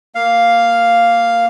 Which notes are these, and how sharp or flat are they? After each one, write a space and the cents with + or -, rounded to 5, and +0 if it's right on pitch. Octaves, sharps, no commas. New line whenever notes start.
A#3 +0 F5 +0